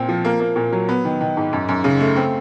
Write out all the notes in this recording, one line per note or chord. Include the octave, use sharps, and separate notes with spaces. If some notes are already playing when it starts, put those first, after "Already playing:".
Already playing: A#2 C4
F3
A#3
A#3
A#2
F#3
B3
D#3
D#3
G#2
F#2
F#2
C#3
A3
C4